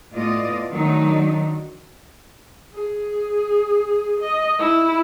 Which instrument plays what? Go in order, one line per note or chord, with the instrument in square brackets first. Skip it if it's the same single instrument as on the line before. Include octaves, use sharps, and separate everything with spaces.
[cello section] A2 A3 B3 F4 D5 D#5
D#3 F#3 A3 D4 D#4
[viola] G#4
D#5
E4